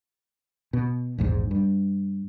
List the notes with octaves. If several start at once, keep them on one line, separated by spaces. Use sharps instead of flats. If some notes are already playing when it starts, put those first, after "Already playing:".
B2
A#1 E2 G#2
G2